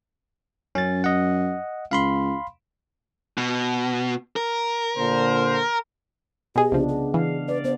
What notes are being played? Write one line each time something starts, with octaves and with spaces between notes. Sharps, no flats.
F#2 C#4 A6
D#5 F#5
C#2 F5 B5 C6
B2
A#4
A#2 D3 C5
B2 G4 G#4 D#5
C2 C#3 F3 B3 D4
G#4
E3 F5
B4 D5
B3 C5